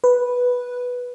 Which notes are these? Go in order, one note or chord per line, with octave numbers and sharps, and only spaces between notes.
B4